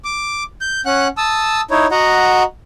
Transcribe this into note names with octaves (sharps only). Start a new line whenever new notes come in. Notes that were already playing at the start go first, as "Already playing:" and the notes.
D6
G6
C#4 F#5 F#6
A5 D#6 E6
D#4 E4 C#5
F#4 D#5 F#5 A#5